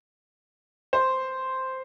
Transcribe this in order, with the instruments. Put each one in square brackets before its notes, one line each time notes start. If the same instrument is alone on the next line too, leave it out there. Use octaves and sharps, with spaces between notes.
[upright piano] C5